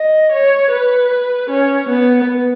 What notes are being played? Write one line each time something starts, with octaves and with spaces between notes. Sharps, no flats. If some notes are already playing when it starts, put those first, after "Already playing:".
Already playing: D#5
C#5
B4
C#4
B3